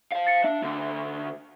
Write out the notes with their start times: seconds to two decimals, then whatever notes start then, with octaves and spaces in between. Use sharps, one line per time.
0.12 C5 F5
0.27 A6 C#7
0.44 D4 E5
0.63 D2 D3